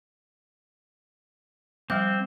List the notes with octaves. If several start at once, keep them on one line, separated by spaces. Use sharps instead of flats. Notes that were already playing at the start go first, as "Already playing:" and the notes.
F3 G3 C4 D6